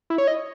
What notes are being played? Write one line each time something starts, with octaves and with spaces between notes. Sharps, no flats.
E4
C#5
D#5